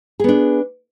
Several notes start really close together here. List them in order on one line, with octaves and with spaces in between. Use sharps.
G#4 B3 D4